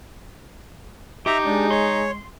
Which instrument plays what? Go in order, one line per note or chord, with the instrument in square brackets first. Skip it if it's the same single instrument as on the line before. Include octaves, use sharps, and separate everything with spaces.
[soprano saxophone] D#4 [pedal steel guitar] G4 [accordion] E5 A#5
[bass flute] G#3 [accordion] D4
[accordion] C#5 [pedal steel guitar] C6